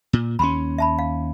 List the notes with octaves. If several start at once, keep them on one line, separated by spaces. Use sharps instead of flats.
A#2
D#2 C#4 B5 C6
E5 A5 B5
F5